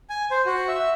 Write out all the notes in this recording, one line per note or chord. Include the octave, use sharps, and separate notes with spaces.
G#5
C5
F#4
E5